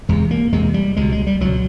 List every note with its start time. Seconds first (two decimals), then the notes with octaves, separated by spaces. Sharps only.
0.09 E2 C3 G#3
0.31 A#3
0.52 E2 C3 G#3
0.74 G3
0.97 C#2 B2 G#3
1.12 G#3
1.27 G3
1.40 C#2 B2 F#3